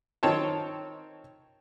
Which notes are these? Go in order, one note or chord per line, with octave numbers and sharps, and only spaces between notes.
D#3 C4 C#5 G5 A5